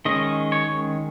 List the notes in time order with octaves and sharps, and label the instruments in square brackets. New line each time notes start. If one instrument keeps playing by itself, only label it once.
[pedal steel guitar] D#3 G#3 C#4 D#5
C#5